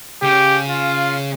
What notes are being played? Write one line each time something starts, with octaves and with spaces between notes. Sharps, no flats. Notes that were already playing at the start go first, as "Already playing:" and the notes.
C#3 G4
F4